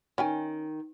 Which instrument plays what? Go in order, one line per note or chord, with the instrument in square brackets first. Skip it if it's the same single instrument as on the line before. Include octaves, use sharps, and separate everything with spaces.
[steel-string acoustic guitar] D#3 [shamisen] C#4 G5 G#5